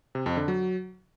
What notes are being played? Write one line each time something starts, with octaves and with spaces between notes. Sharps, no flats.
C3
F2
D3
F#3